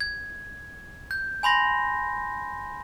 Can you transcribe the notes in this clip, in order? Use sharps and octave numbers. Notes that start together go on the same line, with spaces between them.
G#6
G6
G#5 B5 C6 A#6